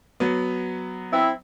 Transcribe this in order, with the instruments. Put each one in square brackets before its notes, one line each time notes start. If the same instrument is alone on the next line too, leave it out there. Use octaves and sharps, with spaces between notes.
[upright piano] F#3 B3
[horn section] C4 E4